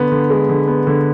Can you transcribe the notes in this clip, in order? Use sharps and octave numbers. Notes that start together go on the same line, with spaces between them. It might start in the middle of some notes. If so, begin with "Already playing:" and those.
Already playing: D3 B3
D3
G#3
D3
B3
D3